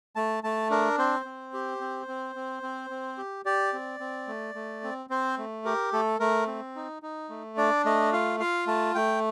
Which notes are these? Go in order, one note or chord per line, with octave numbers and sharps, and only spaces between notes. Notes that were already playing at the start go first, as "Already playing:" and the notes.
A3 A5
A3 A5
D4 A#4
C4 C5
C4
G4
C4
C4
C4
C4
C4
G4
G4 D5
C4
C4
A3
A3
C4
C4 C5
A3
G4 A#4
A3 A4
A3 A#4
C4
D#4
D#4
A3
D4 D5
A3 D#5
F4 F5
F4 F5
A3 A5
A3 G5